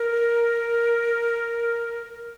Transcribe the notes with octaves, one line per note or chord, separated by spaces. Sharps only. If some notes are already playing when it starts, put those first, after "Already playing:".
Already playing: A#4